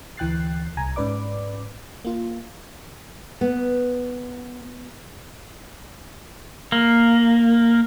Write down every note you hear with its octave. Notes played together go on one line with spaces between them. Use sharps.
D2 E3 G5 F#6 A6 C7
C2 G#5 A#5
G#2 C#4 B4 D5 D6
A#3 F4
B3
A#3